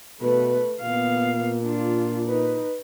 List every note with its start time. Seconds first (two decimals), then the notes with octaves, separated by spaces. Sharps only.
0.21 B2 A3 B4
0.82 A#2 B3 F5
1.64 D4 F4
2.28 D#4 B4